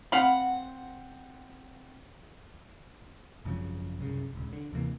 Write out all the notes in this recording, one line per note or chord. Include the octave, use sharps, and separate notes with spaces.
C4 F5 F#5 B5
G#1 F#2 C#3 F3
C2 F#2 C#3
D#1 C#2
D3
D#2 C3 E3 A#3